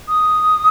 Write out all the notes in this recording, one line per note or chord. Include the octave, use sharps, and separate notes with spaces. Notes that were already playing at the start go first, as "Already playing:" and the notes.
D#6